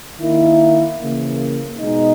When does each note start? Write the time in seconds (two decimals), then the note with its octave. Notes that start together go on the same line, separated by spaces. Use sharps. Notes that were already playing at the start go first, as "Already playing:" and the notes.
0.19 D#3 A#3 E4
0.99 C#3 E3 A#3
1.79 B2 G#3 D#4